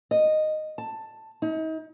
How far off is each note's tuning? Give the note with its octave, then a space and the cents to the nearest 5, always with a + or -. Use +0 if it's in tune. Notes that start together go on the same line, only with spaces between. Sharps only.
D#5 -10
A5 +10
D#4 +40